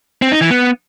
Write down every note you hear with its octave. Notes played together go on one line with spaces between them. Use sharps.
C4
D#4
E3
B3